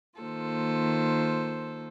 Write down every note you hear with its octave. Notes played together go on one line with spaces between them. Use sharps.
D#3 A#3 F4 A4 C5